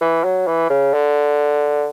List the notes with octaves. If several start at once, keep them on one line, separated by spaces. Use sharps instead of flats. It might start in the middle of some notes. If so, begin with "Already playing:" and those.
E3
F#3
E3
C#3
D3